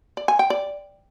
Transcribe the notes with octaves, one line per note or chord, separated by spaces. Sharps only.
D5
G#5
G5
D5